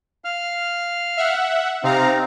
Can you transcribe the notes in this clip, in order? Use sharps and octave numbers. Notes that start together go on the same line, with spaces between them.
F5 F6
E5 F#5
C3 C4 D#4 F5 A#5